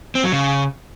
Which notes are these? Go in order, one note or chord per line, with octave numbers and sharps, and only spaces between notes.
C4
F#3
C#3